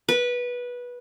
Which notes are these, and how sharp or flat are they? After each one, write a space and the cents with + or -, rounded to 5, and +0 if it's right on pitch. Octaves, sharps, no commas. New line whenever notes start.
B4 -15